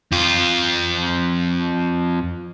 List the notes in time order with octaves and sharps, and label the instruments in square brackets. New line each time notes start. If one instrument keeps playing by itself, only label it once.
[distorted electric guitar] F2 F4